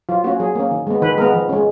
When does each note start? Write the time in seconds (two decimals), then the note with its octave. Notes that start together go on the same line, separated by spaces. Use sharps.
0.09 F#3 F4
0.24 A#3 C#4 F#4
0.40 F#3 G#4
0.55 A#3 C#4
0.71 D#3
0.87 G#3 B3
1.02 D#3 B4
1.18 G#3 B3 A#4
1.34 F3
1.49 G#3 C#4